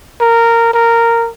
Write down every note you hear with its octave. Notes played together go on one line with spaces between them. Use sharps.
A#4
A#4